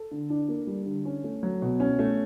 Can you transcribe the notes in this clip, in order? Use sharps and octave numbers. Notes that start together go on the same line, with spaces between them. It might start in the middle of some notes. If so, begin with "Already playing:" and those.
Already playing: A4
D3
D4
A#3
G3
D3
C#4
A3
F#3
B2
C#4
A3